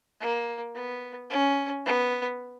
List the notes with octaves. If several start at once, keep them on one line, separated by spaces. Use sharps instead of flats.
A#3
B3
C#4
B3